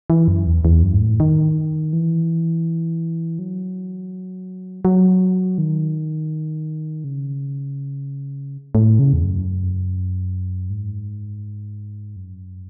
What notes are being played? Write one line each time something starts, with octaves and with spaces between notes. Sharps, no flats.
E3
F#2
E2
E2
F#2
G#2
A2
D#3
E3
F#3
F#3
D#3
C#3
A2
C#3
E2
F#2
G#2
F#2